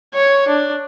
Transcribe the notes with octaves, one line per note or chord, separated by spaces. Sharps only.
C#5
D4